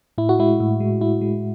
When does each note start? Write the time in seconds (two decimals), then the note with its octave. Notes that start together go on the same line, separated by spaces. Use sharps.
0.18 A2 E4
0.29 F#4
0.39 G#3 E4
0.60 A2
0.80 G#3
1.01 A2 E4
1.21 G#3